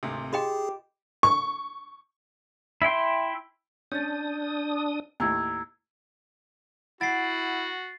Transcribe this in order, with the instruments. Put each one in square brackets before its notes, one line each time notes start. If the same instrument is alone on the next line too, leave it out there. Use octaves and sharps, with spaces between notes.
[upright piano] G#1 D2 C3
[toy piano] F4 D#5 G5 [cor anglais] G4 [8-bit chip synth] G#4 [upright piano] C6 E7
[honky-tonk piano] C#6
[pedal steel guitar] E4 E5 G5 C6
[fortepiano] C#4 [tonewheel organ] D4 D#6 [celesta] G6 A6
[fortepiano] D#2 A2 [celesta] A#5 E6 G#6
[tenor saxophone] E4 [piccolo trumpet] F#4 [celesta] F#5 D7 [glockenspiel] A6 C7